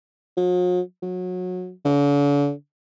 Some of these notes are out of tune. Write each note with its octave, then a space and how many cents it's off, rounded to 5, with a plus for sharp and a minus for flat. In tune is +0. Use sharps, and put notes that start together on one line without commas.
F#3 -45
F#3 -25
D3 -45